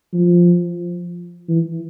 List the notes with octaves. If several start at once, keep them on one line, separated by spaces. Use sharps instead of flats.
F3
E3